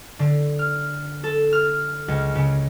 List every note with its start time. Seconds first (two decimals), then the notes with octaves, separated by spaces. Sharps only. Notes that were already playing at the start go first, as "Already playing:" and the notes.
0.19 D3
0.59 F6
1.24 A4
1.53 F6
2.08 C#2
2.35 C#3